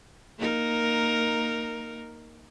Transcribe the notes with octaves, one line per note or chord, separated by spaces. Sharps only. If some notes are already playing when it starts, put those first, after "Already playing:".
A#3 D#4 A#4